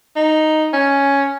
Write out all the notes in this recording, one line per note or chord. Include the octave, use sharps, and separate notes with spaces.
D#4
C#4